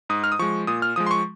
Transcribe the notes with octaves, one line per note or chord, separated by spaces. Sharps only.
G#2 D#6
F6
D#6
F3 G#3 C#6
A#2 D#6
F6
F3 G#3 D#6
C6
C#6